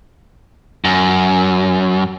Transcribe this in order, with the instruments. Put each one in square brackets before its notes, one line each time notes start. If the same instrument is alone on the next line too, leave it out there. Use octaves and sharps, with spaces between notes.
[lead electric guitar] F#2